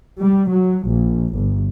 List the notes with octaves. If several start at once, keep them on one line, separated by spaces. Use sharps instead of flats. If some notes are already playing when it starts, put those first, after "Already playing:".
G3
F#3
A#1
G1